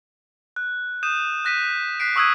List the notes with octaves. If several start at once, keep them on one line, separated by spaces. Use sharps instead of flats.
F#6
D#6 G6 D#7 E7
F#6 A#6 B6 D#7
F#6 B6 C7 D7
C#6 D#6 E6 F#6 G#6 D#7